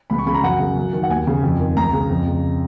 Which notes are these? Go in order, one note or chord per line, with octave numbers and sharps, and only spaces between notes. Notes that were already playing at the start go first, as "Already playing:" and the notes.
C#2 B5
C#6
C#3 B5
A#5
F#2 F#5
C#3
F#2
D#3
F#5
D#2 G#5
C#3
F2
D#3
C#2 A#5
C#3
F2
C#3